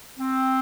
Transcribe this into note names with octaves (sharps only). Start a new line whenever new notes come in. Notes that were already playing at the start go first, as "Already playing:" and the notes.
C4